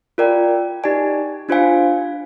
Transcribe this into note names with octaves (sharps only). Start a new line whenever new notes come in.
F4 A#4 D5 G5
D#4 G4 D5 G#5
D4 F4 C5 F5 G#5